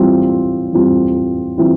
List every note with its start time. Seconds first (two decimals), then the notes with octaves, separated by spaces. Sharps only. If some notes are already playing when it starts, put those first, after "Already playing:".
Already playing: E3 G3 C4 F4
0.73 E3 G3 C4 F4
1.58 E3 G3 C4 F4